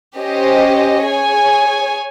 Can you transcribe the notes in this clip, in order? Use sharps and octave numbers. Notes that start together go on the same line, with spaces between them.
C#4 G4 C5 D#5
G#4 C#5 G#5